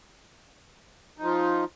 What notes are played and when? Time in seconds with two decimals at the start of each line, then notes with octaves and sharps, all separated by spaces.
1.18 D#4
1.21 F3
1.24 F4